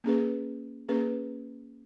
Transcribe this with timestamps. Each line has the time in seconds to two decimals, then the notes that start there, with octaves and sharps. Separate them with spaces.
0.04 A#3 C#4 G#4 B4
0.88 A#3 C#4 G#4 B4